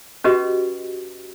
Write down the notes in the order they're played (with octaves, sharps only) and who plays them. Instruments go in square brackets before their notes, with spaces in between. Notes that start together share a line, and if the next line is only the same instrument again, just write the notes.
[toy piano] C#4 F#4 G4 B4 D#5